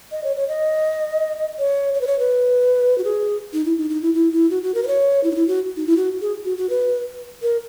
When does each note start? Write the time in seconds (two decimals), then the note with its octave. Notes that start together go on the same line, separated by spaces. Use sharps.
0.12 D#5
0.24 C#5
0.36 C#5
0.48 D#5
1.59 C#5
1.94 C#5
2.01 B4
2.07 C#5
2.19 B4
2.98 F#4
3.04 G#4
3.53 D#4
3.65 E4
3.78 D#4
3.90 D#4
4.02 E4
4.14 E4
4.33 E4
4.50 F#4
4.63 F#4
4.75 A#4
4.83 B4
4.87 C#5
5.24 E4
5.31 D#4
5.35 E4
5.48 F#4
5.77 D#4
5.87 E4
5.97 F#4
6.21 G#4
6.45 F#4
6.57 F#4
6.70 B4
7.42 A#4